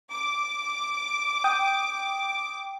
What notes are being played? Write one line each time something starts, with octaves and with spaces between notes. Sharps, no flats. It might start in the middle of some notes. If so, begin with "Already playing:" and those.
D6
G5 D#6